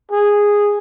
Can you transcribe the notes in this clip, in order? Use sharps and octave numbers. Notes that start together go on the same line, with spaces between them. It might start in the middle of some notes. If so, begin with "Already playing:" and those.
G#4